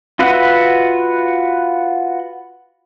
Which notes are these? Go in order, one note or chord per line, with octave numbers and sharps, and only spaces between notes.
F4 F#4 B4 E5 F#5